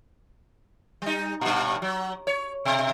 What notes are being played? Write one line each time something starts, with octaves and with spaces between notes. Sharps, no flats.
G3 D#4
G2 A#2
F#3
C#5
B2